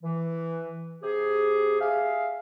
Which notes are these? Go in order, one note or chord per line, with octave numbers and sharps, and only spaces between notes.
E3
C3 G4 G#4
G#4 E5 F5